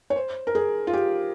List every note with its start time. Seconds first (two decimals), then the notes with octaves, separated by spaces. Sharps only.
0.10 C#5
0.16 C5
0.47 A#4
0.55 G#4
0.87 F4
0.93 G4